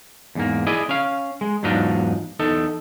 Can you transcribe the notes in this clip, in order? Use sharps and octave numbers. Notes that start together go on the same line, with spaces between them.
E2 G#2 A#3
E4 G#4 D5 D#5
C#4 F5
G#3
E2 G#2 F#3 D4 D#4 F4
E2 D#4 A4